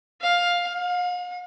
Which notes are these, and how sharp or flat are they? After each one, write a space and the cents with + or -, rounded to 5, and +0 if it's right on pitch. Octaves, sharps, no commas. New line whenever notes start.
F5 +10
F5 +45